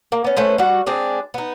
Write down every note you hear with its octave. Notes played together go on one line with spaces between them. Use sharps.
A#3
B3 C#4
A3 C#4 B4 C5
G3 F#4
G#3 C4 D4 G#4
B3 D#4